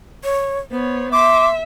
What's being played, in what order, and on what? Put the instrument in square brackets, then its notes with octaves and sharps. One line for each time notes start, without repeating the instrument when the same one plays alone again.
[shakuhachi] C#5
[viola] B3 C#5 [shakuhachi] C5
[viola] E5 [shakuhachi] C6 [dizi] D6